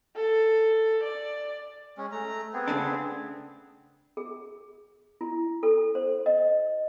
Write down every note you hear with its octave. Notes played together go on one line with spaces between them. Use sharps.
A4
D5
G#3 C#4
A3 A#5
B3 C4 G#4
C#3 A3 D4
G#4
E4
A4
C5
D#5